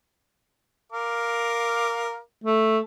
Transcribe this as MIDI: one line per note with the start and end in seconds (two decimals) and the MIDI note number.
0.92 2.19 70
0.92 2.19 77
0.92 2.19 86
2.44 2.78 57